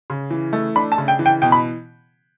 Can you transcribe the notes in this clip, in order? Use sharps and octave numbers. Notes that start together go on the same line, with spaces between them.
C#3
E3
A3
D4 B5
A5
C#3
G5
E3
G5
B2 G5
B5